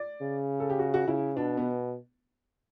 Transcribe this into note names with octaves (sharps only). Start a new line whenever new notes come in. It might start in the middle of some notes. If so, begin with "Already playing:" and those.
Already playing: D5
C#3
A4
G4
F#4
F#4
C#3 E4
B2 D4
B3